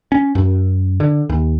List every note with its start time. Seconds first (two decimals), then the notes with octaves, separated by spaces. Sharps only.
0.12 C#4
0.35 F#2
1.00 D3
1.29 D#2